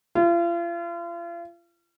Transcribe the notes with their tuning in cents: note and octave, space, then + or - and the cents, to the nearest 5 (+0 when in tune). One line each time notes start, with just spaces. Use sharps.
F4 -40